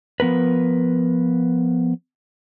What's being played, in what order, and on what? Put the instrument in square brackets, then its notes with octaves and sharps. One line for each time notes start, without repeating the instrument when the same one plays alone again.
[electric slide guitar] F3 B3 A#4 B4